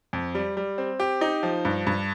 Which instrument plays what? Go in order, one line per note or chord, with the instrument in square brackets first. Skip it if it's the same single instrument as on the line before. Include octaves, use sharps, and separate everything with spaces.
[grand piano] F2
G3
G3
C4
G4
D#4
F3
G2
G2